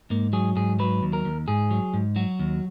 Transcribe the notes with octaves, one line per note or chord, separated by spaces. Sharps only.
G#2 A#3
F#3 G#4
G#2 G#4
F#3 B4
D#2
A#4
D#2
G#2 G#4
F#3
G#2
F#3 F#4
D#2